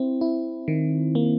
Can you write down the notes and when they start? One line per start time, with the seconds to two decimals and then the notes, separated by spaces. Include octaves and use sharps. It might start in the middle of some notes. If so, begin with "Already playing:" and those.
Already playing: C4 E4
0.21 E4
0.68 D#3
1.15 A#3